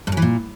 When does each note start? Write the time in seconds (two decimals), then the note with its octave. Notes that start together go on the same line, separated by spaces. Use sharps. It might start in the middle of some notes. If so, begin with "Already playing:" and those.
0.07 G2
0.12 F#2
0.17 E3
0.22 A#2